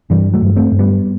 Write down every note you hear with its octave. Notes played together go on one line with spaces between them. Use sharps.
G2 E3 G3
F#3 A3
G2
A3 C4
G2
G3 B3